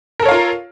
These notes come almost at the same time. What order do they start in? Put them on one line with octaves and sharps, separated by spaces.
A#4 A4 C#5 F5 F4